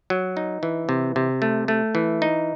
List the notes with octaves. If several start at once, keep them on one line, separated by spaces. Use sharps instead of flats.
F#3
D#4
E3
C3
C3
A3
A3
E3
D#4